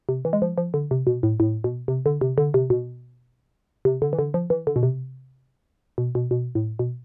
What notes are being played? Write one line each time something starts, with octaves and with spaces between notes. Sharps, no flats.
C3
E3
G#3
F3
F3
D3
C3
B2
A2
A2
B2
C3
D3
C3
D3
C3
B2
C3
D3
E3
D3
F3
E3
D3
B2
C3
B2
B2
B2
A2
B2